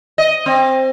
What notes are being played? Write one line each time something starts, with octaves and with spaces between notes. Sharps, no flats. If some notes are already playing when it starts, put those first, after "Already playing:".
D#5
C4